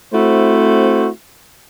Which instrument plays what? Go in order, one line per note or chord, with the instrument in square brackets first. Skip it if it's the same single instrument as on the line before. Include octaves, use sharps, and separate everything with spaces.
[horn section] A3 C4 E4 F#4 C5